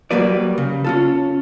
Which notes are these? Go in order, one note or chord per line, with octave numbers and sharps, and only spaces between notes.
F#3 G3 A#3 B4 D5
C#3
C#4 F4 A4